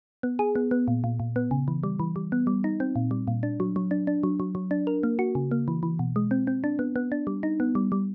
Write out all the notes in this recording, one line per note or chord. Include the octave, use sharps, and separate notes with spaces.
B3
G#4
B3
B3
A#2
A#2
A#2
B3
C#3
E3
G3
E3
G3
B3
G3
D#4
C4
A#2
G3
A#2
D4
F#3
F#3
D4
D4
F#3
F#3
F#3
D4
A#4
A#3
F#4
C#3
A#3
E3
E3
B2
G#3
C4
C4
D4
B3
B3
D4
G3
D#4
B3
G3
G3